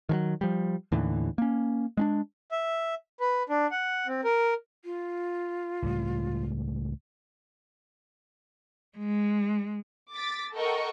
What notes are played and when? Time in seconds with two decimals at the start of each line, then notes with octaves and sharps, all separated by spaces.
0.09 D#3 E3 F#3
0.41 F3 G3
0.92 D#2 A2 D3 E3
1.38 A#3 C#4
1.97 G#3 C#4 D4
2.51 E5
3.20 B4
3.49 D4
3.71 F#5
4.07 C4
4.24 A#4
4.85 F4
5.82 C#2 A2 G3
8.98 G#3
10.12 D6 A6 B6
10.54 A4 A#4 D#5 F#5 G5 C#6